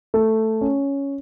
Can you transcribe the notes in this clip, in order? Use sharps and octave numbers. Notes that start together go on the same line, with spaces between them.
A3
C#4